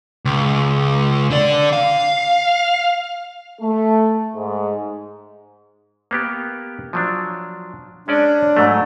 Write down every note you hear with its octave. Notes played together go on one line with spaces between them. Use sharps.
C#2
D3 D5
F5
A3
G#2
A#3 B3 G4
F3 F#3 D4
G#3 C#4 D4 D5
G#2 F#3 A3